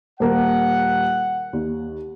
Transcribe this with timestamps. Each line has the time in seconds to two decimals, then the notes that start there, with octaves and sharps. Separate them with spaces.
0.20 D#1 A#3 A#4 F#5
1.53 D#2